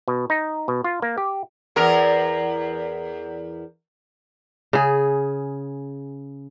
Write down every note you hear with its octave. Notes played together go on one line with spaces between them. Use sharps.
B2
D#4
B2
F4
A#3
G4
E2 A#4
C#3 G#4